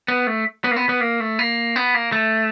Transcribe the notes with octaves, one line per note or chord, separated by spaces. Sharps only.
B3
A3
B3
A#3
B3
B3
A#3
A3
A#3
B3
A#3
A3